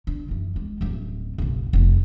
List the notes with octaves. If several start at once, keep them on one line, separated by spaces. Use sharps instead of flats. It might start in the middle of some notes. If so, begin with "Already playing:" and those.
D3
F#2 E3
G#3
D1 F#2
F#1 B1
F1 A3